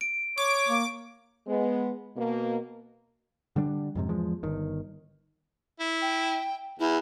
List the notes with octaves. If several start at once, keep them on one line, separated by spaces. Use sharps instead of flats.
D7
C#5 D6
A#3
G#3 B3
B2 A#3
D3 G3 C4 D4
F2 G#2 C3
E2 F3 G#3
G1 D#3
E4
G5
E2 E4